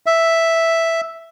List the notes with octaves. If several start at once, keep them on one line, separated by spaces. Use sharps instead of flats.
E5